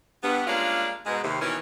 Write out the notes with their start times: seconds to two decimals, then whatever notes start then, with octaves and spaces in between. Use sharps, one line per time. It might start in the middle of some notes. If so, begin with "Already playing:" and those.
0.23 G2 B3
0.47 G3 G#3 A#3 C#4 D4 F4
1.06 G#2 B2 G#3
1.23 D#2 C3
1.40 B2 D#3 E3 C#4